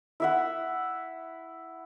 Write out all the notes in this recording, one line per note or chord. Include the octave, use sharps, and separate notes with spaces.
E4 E5 F#5